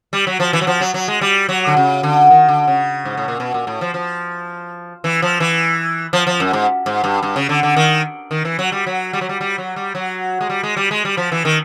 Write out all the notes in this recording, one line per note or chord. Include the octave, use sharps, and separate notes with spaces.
G3
F#3
F3
E3
F#3
F3
F#3
F#3
G#3
G3
F#3
D3
C#3
D3
D#3
D3
C#3
G#2
A2
A#2
B2
A#2
A2
F3
F3
E3
F3
E3
F3
F3
F#2
G#2
G#2
G2
G2
C#3
D3
D3
D#3
D#3
E3
F#3
G3
F#3
G3
F#3
G3
G3
F#3
G3
F#3
G#3
G3
G#3
G3
G#3
G3
F3
E3
D#3